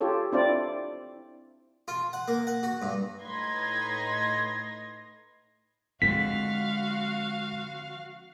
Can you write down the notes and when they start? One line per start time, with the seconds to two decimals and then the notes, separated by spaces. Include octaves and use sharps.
0.01 F4 G4 A4 C#5
0.32 C4 D4 E4 F4 C5 D5
1.88 F4
2.13 F#5
2.28 A#3
2.47 F#5
2.63 F#4
2.82 G2
3.21 A2 D#4 B4 C6 G#6 A#6
6.02 D3 F3 G#3 C4 F#4 F5 B6